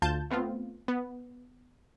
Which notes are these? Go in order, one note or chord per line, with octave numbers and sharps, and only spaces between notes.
D2 F4 A5 G6
A3 B3 C4 F4
B3